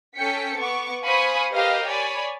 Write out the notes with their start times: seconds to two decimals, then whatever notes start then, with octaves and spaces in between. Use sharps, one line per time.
0.16 C#4 A4 G5 B6 C#7
0.58 B3 C#6 D6
1.03 C5 F5 G#5 B5 C#6 D#6
1.52 G4 A#4 B4 D#5 F5
1.88 C#5 D5 G#5 B5